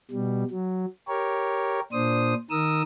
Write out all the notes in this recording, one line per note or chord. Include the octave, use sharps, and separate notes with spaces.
B2 G3
F#3
G4 A#4 C#5
A#2 D4 C5 D#6
D#3 A#4 D#6 E6